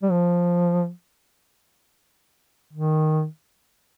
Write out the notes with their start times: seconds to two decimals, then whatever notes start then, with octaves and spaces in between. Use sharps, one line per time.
0.03 G3
0.11 F3
2.73 D#3